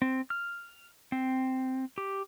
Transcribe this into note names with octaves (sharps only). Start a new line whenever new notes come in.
C4
F6
C4
G4